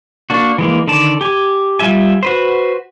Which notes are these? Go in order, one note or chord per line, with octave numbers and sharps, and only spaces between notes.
A#3 D4 F#4
E3 G#3 A#3
D3 D#3 D5 A5
G4 G#5
G3 F4 E5 G#5
F#4 B4 C5